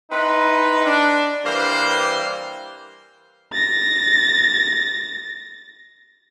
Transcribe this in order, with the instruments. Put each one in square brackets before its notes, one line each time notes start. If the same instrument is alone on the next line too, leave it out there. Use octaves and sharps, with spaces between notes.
[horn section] C4 D#4 E4 B4
D4
G2 E3 G3 A#3 C5
[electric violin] A6 A#6